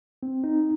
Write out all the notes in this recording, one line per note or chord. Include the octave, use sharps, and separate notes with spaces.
C4
D#4